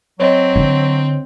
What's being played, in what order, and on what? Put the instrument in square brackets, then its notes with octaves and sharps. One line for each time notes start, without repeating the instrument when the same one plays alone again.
[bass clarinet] F#3 [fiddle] C4 [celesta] C#5 D#5
[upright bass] D3